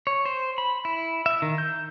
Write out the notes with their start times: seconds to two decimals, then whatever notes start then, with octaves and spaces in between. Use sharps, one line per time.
0.07 C#5
0.26 C5
0.58 B5
0.85 E4
1.26 E5
1.42 D#3
1.58 G6